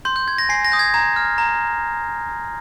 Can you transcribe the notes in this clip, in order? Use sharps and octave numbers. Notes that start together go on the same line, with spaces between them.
C6 G6
G6
G6 G#6
A#6
G#5 C7
A#6
D#6 G6
G#6
A#5 G#6
F6
A#5